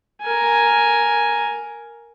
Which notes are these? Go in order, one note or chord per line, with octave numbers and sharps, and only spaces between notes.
A#4 G#5